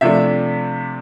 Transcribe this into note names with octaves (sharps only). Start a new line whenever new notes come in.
C3 F3 A3 D4 E5